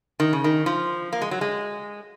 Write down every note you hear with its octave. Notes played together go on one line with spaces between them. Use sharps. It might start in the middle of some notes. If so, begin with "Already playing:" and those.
D#3
C#3
D#3
F3
A#3
G#3
F#3
G#3